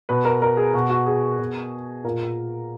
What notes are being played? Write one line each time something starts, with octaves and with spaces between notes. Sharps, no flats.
B2 B4
A#4
A#4
G#4
B2 F#4
F#4
G#4
B2
A#2 A#4